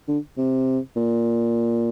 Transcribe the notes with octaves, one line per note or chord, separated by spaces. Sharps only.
D3
C3
A#2